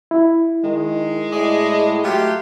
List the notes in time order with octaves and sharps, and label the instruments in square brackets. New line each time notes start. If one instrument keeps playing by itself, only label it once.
[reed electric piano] E4
[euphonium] D#3 [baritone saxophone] G#3
[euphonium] A2 [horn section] G#4 D5 D#5
[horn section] F#3 F4 G4 [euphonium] A3